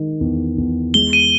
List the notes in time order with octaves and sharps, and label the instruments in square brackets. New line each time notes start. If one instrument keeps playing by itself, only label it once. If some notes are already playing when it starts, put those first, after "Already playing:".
Already playing: [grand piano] D#3 G#3
E2
E2
[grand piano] G#3 [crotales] G7
[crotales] D#7